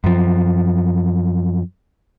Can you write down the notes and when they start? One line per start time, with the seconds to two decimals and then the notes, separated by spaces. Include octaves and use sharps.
0.04 F#2 F3